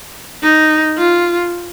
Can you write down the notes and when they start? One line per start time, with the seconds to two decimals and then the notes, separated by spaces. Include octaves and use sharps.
0.43 D#4
0.98 F4